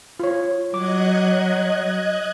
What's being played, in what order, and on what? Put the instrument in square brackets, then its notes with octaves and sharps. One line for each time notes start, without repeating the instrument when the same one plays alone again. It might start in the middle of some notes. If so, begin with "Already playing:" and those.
[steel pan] F4 C#5
[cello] F#3 [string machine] D#5 F#6 G#6 [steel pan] D6